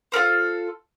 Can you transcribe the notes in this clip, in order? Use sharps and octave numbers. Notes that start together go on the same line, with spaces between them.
F4 A4 A#4 C5